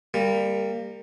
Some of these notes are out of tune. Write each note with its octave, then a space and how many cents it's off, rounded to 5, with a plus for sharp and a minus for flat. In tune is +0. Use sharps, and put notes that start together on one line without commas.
G3 +20 A#3 -15